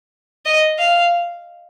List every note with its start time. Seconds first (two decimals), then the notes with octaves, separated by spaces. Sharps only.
0.45 D#5
0.78 F5